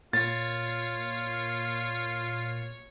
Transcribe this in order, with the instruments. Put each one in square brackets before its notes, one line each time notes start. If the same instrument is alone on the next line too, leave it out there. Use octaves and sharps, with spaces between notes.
[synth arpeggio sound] A#2 [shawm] F4 [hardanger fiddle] C#5 [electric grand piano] A6